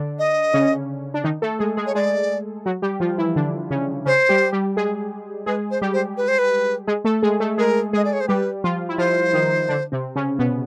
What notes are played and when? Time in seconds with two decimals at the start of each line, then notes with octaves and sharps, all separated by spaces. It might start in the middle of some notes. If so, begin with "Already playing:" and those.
Already playing: D3 D4
0.19 D#5
0.54 C#3 C#4
1.14 D4
1.24 D#3 D#4
1.42 A3 A4
1.59 G#3 G#4
1.77 G#3 G#4
1.86 C#5
1.95 G#3 G#4 D5
2.66 F#3 F#4
2.82 G3 G4
3.00 F3 F4
3.18 E3 E4
3.36 D3 D4
3.70 C#3 C#4
4.05 C#3 C#4 C5
4.29 G3 G4
4.52 G3 G4
4.77 G#3 G#4
5.46 G#3 G#4 B4
5.71 C5
5.82 G3 G4
5.94 C5
6.17 B4
6.28 C5
6.39 B4
6.87 G#3 G#4
7.05 A3 A4
7.23 G#3 G#4
7.40 A3 A4
7.58 G#3 G#4 A#4
7.93 G#3 G#4 D#5
8.05 D5
8.13 C#5
8.21 C5
8.28 G3 G4 B4
8.64 F3 F4
8.89 E4
8.98 F3 F4 C5
9.33 D#3 D#4
9.69 D3 D4
9.92 C3 C4
10.16 C#3 C#4
10.39 B2 B3